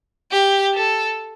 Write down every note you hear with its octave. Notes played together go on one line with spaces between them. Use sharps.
G4
A4